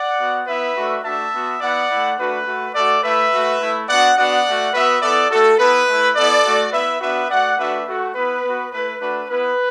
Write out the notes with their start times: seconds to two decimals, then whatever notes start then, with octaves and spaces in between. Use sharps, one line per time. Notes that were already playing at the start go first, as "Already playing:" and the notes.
Already playing: D5 F#5
0.19 B3 F#4
0.47 B3 E4 B4 E5
0.76 A3 D4 F#4
1.04 A3 D4 F#4 E5 A5
1.33 B3 F#4
1.61 B3 E4 D5 F#5
1.89 A3 E4
2.18 A3 D4 F#4 B4
2.46 A3 F#4
2.74 A3 F#4 A4 D5
3.03 A3 E4 B4 E5
3.32 A3 F#4
3.60 A3 E4
3.88 B3 D4 F#4 D5 F#5
4.17 B3 D4 F#4 D5 F#5
4.46 A3 F#4
4.74 B3 F#4 B4 E5
5.02 B3 E4 A4 D5
5.30 A3 F#4 A4
5.59 B3 E4 B4
5.87 A3 E4
6.16 B3 E4 A4 D5
6.44 A3 F#4
6.72 B3 E4 B4 E5
7.01 B3 D4 F#4 B4 E5
7.30 A3 F#4 D5 F#5
7.58 A3 D4 F#4 B4 E5
7.86 A3 F#4
8.15 B3 E4 B4
8.43 B3 F#4
8.72 A3 E4 B4
9.00 A3 D4 F#4 B4
9.28 B3 E4 B4